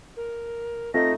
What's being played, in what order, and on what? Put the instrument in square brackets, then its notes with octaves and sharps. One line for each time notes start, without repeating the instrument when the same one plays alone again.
[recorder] A#4
[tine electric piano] A3 D#4 [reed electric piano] C4 F4 A4 [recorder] D#5 [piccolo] A#6